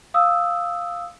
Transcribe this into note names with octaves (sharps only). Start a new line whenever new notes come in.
F5 D#6 E6